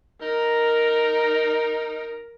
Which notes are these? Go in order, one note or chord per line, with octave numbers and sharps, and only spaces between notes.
D#4 A#4